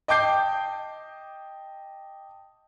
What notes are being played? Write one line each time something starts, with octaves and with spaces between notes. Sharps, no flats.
D#5 G5 A5 D6 G6 C7